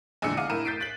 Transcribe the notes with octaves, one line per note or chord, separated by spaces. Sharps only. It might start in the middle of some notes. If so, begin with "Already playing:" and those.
A#1 E2 D3 G#3 E6 C#7
F5 F#5 D6 F6 D#7
A2 E4 A#4 D#7 E7
G6 A6 B6 C7 D7
F#6 A6 B6 F#7